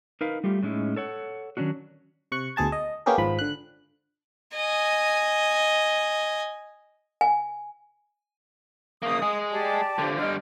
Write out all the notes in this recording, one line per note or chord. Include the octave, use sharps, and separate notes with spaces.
D#4 A#4 B4 F5
G3 A3 F4 G4
A2 G#3 C#4 D#4 E4
A4 C#5 F#5
D#3 F#3 C#4 D4 F#4
C3 C#6 F#6 C#7
D2 B2 G#4 A5 G#6
D#5
A#3 B3 C#4 G4 G#4 A#4
G#1 G#2 F3 B5
D3 F#6
D#5 G#5
G#5
C#3 A#3 D#6
G#3 G#4
G4 D5 A5
D3 F3
D3 G3 D#5 F6